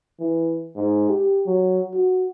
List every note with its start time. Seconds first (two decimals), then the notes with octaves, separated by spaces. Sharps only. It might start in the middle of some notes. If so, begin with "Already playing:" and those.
0.20 E3
0.76 G#2
1.10 G4
1.46 F#3
1.94 F#4